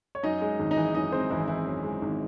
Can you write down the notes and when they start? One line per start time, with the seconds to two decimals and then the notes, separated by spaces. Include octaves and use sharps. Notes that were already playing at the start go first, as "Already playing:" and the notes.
0.15 C#5
0.23 F#2 D#4 D#5
0.41 G#3
0.59 G#1
0.71 D#4 D#5
0.77 E3
0.94 F#2 D#4 D#5
1.12 G#3 C4 C5
1.30 G#1 E3 E4
1.48 E3 E4
1.66 F#2
1.84 G#3
2.02 G#1